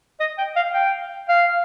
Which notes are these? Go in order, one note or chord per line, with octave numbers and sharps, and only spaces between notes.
D#5
G5
F5
G5
F5